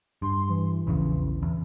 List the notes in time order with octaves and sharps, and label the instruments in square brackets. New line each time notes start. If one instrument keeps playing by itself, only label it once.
[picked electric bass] G2 [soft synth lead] C6
[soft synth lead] E3
[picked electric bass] A#1 E2 C#3
E2